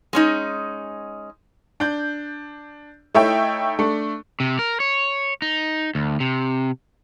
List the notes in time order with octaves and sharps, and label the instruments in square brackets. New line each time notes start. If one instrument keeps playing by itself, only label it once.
[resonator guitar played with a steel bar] G#3 C#4 D#4
[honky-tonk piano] D4 G6
A3 D#4 E4 C#5 E5 G5
A3 D4
[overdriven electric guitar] C3
A#4
C#5
D#4
D2
C3